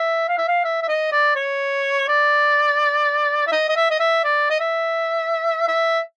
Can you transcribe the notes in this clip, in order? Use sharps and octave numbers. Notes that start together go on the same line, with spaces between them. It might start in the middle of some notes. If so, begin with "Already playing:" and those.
Already playing: E5
F5
E5
F5
E5
E5
D#5
D5
C#5
D5
E5
D#5
D#5
E5
D#5
E5
D5
D#5
E5
E5